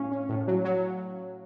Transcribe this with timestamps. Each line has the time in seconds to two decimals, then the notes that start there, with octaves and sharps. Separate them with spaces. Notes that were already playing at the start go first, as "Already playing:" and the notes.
Already playing: A2 C#4 F5
0.12 C#4
0.29 A2
0.48 F#3
0.65 F#3